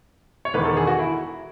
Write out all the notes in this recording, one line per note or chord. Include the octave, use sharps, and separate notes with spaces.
C#5
E1 E2 D#3 B4
A4
G#4
F#4
E4